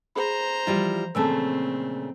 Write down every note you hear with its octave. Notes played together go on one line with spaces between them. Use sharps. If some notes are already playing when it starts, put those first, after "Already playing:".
G#4 C5 A#5 B5
E3 F3 G3 E4 F4
A#2 C#3 A3 C4 A5 E6